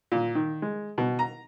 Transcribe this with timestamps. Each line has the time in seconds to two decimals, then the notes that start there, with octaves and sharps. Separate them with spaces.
0.12 A#2
0.35 D#3
0.62 G#3
0.98 B2
1.19 A#5